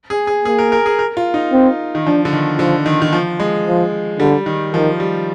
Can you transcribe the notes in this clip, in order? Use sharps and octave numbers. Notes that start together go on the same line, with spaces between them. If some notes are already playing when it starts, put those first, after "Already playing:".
G#4
G#4
A#3 G#4
A#4
A#4
G#4
A#4
F4
D#4
C4
D#3
F3 D4
D3
D#3
D3 F3
D#3
D#3
F3
G#3
F3
D3 G3
D#3
D#3 F3
G3